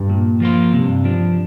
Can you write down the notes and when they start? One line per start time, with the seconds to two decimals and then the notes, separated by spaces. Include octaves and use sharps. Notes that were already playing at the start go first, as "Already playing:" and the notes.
Already playing: G2
0.10 A#2
0.40 F3 A#3 F4
0.73 G2 C3
1.04 F3 D4